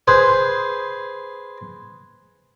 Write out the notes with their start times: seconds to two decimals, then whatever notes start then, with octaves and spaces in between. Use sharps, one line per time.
0.08 G#4 B4 C5